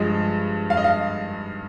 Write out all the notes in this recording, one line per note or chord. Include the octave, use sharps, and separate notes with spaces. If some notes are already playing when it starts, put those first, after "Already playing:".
Already playing: G2 F3 G#3 D#5
F5
D#5
F5